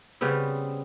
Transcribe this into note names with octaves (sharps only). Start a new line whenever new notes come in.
C#3 G3 B3 C4